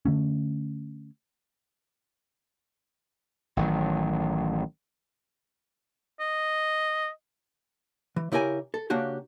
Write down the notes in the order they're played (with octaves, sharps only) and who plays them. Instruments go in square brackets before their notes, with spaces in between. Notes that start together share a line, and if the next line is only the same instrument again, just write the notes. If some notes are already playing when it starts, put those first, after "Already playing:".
[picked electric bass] D3 A3 C#4
[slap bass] A1 D#3 F#3
[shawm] D#5
[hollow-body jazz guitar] E3
C#3 E4 G4 A#4 G#5
A4
C#3 A#3 D4 F#4 G4